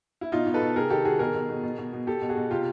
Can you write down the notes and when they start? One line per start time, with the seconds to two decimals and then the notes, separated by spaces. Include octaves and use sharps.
0.21 E4
0.32 B2 D#4 F4
0.47 B2
0.54 A4 B4
0.62 B2
0.76 C3 G#4 A#4
0.90 D#3 G4 A4
1.05 D#3 F#4 G#4
1.19 B2 G#4 A#4
1.34 B2
1.49 B2
1.63 B2
1.78 B2
1.93 B2
2.07 B2 G4 A4
2.22 B2
2.29 F#4 G#4
2.37 B2
2.51 C3 F4 G4